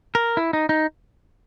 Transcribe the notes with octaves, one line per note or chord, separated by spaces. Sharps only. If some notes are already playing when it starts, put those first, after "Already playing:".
A#4
E4
D#4
D#4